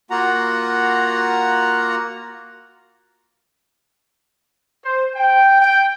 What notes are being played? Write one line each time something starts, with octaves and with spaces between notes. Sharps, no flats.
A#3 F4 F#4 F#5 A#5
C5
G5
G5